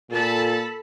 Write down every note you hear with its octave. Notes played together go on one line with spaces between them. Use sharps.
A#2 A4 A5 B5